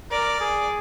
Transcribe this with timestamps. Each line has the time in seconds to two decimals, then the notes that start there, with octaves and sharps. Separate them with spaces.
0.11 A#4 D5
0.41 G#4